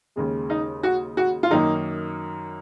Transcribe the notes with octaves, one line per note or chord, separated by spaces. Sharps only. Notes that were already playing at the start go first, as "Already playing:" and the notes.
D#2 C#3 G#3
D#4
F#4
F#4
F4
F#2 D#3 A#3 D#4